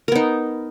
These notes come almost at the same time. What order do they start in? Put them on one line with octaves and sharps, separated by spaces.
A#4 B3 D#4